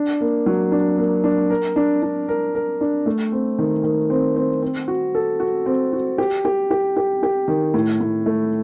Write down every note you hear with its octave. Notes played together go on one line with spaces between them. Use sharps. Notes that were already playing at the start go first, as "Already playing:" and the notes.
Already playing: D4
A#3
F#3
D4
A#3
D4
A#4
D4
D4
A#4
A#4
D4
A3
C4
D#3
D#3
C4
C4
C4
F#4
A4
F#4
C4
F#4
G4
G4
G4
G4
G4
D#3
A2
A2
A3